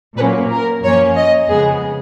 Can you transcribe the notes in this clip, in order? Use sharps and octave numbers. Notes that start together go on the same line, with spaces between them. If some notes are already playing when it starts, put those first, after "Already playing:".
A#2 F#3 A#3 C#4 B4
A#4
F#2 F3 A#3 C#4 C#5
D#5
F2 C#3 G#3 B3 G#4